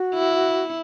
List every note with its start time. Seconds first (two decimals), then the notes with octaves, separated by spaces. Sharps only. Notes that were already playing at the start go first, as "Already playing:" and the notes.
Already playing: F#4
0.15 E4